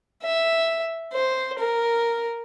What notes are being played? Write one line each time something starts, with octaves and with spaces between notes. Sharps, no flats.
E5
C5
A#4